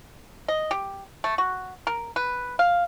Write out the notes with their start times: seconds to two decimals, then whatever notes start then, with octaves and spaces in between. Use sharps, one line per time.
0.48 D#5
0.71 G4
1.24 A3
1.38 F#4
1.87 A#4
2.16 B4
2.59 F5